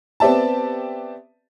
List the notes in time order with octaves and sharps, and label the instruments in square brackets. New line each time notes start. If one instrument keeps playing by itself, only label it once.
[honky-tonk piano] B3 C4 G4 D5 E5 A5